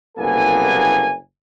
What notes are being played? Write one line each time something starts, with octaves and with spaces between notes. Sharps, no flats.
F#1 C2 A#3 B3 A4 G#5